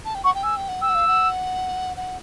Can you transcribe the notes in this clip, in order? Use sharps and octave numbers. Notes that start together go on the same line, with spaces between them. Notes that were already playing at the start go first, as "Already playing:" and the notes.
A5
G5
F#5 C#6
G5
G#5 E6
G5
F#5
G5 E6
F#5
F5
F#5
F#5